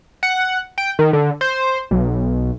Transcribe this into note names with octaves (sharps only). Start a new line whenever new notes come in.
F#5
G5
D#3
D3
C5
B1